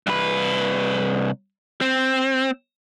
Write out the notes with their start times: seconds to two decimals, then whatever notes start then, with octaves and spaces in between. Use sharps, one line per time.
0.07 C2 B4
1.81 C4